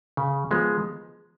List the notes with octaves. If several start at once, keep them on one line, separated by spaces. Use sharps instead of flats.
C#3
F3 G#3 B3